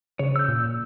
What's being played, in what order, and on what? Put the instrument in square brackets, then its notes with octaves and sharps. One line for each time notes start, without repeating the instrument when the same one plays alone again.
[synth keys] C#3 [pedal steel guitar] C#5
[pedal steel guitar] E6 G6
[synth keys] A#2